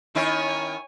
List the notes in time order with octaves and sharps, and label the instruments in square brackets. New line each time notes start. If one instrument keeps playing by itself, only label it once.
[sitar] D#3 C#4 E4 [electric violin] C#5 G#5